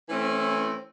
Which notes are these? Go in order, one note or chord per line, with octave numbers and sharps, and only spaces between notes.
E3 A3 C4 C#4 E4